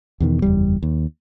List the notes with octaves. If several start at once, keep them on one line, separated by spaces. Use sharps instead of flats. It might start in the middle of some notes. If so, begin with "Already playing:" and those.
E2 B2 D#3
F#1 E2 G3
D#2